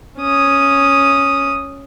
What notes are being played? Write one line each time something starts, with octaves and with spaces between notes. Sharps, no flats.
C#4 D#6